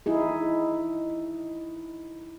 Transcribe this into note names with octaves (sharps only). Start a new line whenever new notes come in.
D#4 E4 G#4